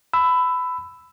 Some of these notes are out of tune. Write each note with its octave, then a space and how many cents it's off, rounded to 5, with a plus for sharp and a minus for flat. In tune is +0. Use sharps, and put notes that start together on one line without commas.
B5 +20 E6 +0